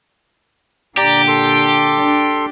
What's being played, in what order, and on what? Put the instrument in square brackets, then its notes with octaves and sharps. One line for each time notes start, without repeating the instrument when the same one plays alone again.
[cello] A#2 D3 [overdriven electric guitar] G4 [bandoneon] D5 A#5
[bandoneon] A4 C6
[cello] D4